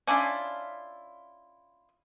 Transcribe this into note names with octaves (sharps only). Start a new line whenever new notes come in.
C#4 D4 E4 F4